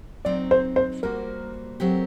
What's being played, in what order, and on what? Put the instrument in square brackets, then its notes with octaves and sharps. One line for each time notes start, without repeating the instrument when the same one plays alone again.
[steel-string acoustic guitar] F#3 C4 D#4 [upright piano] D5
[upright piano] C5
C5
[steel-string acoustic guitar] G3 A#3 F#4 C5 [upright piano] A#4
[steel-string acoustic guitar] F#3 A3 C4 G4 A#4